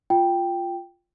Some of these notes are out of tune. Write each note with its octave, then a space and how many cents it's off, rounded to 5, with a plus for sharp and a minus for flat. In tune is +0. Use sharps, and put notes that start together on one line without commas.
F4 +0 G5 +0